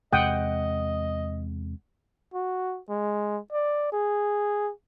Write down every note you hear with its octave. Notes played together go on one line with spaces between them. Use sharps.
E2 C3 G#3 D#5 F#5 G5 D#6
F#4
G#3
D5
G#4